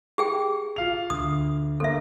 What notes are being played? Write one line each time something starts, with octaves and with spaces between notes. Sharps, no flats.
G4 G#4 G5
F4 F5 F7
D2 D#6
G1 A#3 A4 E5